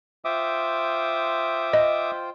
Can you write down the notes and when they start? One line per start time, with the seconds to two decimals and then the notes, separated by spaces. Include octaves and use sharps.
0.25 F4 C5 E5 G5 D6 D#6
1.73 D#5